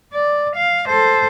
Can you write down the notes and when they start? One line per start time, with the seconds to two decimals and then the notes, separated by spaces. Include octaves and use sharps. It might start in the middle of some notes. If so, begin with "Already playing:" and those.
0.13 D5
0.56 F5
0.88 A4 C5